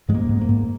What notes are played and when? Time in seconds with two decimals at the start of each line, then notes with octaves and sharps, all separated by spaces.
0.09 G#2 G#3
0.15 A#3
0.29 G#2
0.41 A#3
0.49 G#2